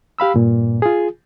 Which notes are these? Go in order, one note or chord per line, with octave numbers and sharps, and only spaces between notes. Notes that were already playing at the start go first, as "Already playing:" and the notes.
G4 F5 B5 E6
G2 A#2
F4 G#4